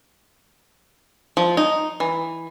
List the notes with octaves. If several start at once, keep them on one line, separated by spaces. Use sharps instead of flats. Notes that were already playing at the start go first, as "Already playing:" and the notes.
F3
D#4
E3